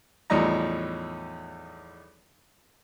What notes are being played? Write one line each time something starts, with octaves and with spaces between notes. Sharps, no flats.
E2 A2 F3 G3 D#4 A#5